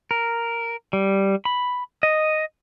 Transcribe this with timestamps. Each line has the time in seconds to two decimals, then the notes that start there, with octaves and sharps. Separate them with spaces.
0.11 A#4
0.93 G3
1.45 B5
2.03 D#5